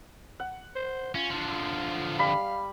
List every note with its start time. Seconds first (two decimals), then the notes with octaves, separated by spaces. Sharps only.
0.40 F#5
0.76 C5
1.15 C#4 F4
1.31 D3 F3
2.19 G3 F5 B5